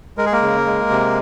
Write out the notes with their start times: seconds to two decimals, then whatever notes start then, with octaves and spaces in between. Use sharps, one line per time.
0.18 G#3 A#4
0.26 G#4
0.32 A#3 A#4
0.42 C#3
0.66 G#3
0.90 C3